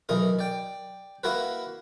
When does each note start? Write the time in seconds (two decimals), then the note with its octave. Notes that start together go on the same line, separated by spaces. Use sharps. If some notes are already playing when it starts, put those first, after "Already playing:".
0.09 B1 E3 D#4 A#4
0.39 D5 G5
1.24 A#3 E4 F#4 A#4 B4